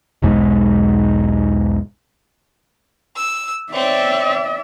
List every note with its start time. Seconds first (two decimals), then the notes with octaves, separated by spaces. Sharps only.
0.22 E1 B1 G#2 G#3
3.16 E6
3.73 C4 C#5 D5 E5